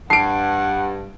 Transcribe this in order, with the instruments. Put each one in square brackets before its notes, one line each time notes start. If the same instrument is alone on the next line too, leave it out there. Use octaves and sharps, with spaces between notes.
[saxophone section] G2 [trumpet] F#5 [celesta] A5 [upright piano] C7 D7